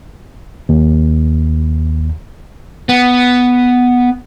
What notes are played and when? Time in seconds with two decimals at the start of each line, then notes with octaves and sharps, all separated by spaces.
0.69 D#2
2.89 B3